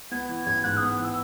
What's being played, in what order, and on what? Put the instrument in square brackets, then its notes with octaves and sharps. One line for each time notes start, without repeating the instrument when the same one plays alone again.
[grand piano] B3 [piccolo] G#6
[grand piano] E3
[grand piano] A1 [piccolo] G#6
[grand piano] G#2 [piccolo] F#6
[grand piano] B3 [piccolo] D#6
[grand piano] E3 [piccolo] E6